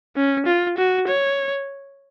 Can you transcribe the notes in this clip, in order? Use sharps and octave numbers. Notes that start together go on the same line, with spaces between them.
C#4
F4
F#4
C#5